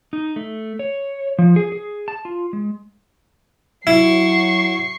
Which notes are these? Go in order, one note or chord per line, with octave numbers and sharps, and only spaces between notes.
D#4
A3
C#5
F3
G#4
G#4
A5
F4
G#3
F#3 E4 C#6 C7